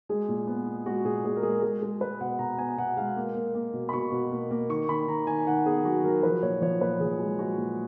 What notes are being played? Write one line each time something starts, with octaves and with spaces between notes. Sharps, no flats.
G#3 G#4
A#2
B3
A#2
G#3 F#4
A#2 G#4
A#2 G#4
A#4
G#3 G#4
G#3 G#4
G#3 G#4
G#3 B4
B2 F#5
B2 A#5
B3 G#5
B2 F#5
G#3 F5
A#3
A#3
A#3
B2
B5
B2 C#6
B2
A#3
A#3
D#3 C#6
D#3 B5
D#3 A#5
D#3 G#5
D#3 F#5
B3 G#4
F#3 F#4
F#3 A#4
F3 B4
A#2 C#5
F3 C#5
A#2 B4
F3 G#4
G#3
G#3 F#4
A#2